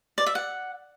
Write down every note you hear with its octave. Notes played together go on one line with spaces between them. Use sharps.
D5
E5
F#5